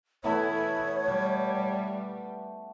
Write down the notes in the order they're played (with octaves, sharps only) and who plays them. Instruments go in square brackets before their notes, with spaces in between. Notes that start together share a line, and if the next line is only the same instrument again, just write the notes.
[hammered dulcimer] E3 A3 B3 [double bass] E4 [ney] C#5
[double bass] G3